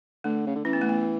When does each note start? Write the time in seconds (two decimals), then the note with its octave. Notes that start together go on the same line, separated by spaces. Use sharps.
0.24 D3 A3
0.47 C#3
0.56 D3
0.65 E3 C#4
0.73 B3
0.82 A3
0.89 B3